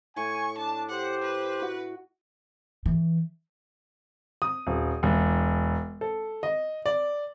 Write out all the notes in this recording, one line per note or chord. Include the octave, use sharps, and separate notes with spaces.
A2 G#5 C#6
D4 A5
G4 C5 F#5
B4
F#4
E3
D#6
D#1
E1
A4
D#5
D5